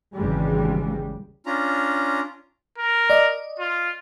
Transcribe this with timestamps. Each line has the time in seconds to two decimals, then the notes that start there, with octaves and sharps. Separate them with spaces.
0.15 G#1 D#2 C#3 E3 G3 G#3
1.46 C#4 D4 F4 A#5
2.78 A#4
3.10 D5 D#5
3.59 F4